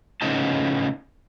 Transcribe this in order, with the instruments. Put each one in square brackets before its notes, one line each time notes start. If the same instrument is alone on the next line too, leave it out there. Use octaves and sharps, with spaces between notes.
[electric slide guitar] A2 C#3 F3 B3 D#4 A5